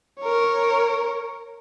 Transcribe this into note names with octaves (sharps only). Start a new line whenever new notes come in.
A#4 C#5